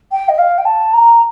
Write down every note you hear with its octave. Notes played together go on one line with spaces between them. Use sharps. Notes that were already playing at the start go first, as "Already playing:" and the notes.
G5
D#5
F5
G5
A5
A#5